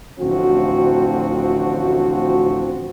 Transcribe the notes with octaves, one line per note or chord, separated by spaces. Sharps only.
A1 D2 F3 C4 F#4